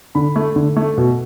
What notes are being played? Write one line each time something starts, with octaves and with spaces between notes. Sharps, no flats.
D3 B5
A3
D3
A3
B2